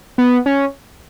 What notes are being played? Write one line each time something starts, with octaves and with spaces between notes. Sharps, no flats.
B3
C#4